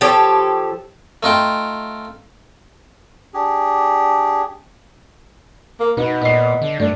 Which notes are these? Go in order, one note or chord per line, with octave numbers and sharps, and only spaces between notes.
F3 G4 A4 C#5
A3 D#4 F4 G5
D4 G4 G#4
A#3
B2 B3 D#4
A#2 D#5 C7
D3
G2 A3 D4